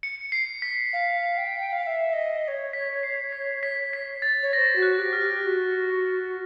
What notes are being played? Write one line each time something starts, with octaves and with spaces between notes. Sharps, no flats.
C#7
C7
B6
F5
G5
F5
F5
E5
D#5
D#5
C#5
B6
C7
B6
B6
B6
A6
C#5
C#5 A#6
C5
F#4
F#6
G4
F6
G4
G4
F#4